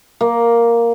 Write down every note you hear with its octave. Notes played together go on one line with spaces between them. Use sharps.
A#3